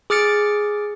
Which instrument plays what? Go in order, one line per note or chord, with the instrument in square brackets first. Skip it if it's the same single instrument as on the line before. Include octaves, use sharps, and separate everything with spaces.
[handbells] G#4 D6 F6 A6 C#7 D7